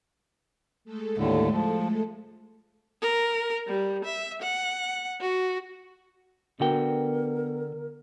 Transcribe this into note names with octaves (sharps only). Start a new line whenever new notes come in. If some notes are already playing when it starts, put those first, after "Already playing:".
G#3 A3 A4
D#2 A2 D3
F3
A#4
G3
E5
F#5
F#4
D3 B3 F#4 A#4 G5